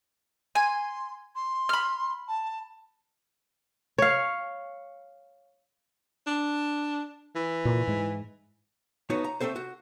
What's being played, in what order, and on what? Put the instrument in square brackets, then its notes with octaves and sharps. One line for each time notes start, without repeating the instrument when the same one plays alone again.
[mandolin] G#5 [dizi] C6
[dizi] C6
[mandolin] B5 F6
[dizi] A5
[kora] C#5 F5
[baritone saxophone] D4
E3
[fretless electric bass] A#2
G#2 G#3
[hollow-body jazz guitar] A3 B3 D#4 F#4 C#5
A#5
A3 A#3 C4 A4 C5
F#4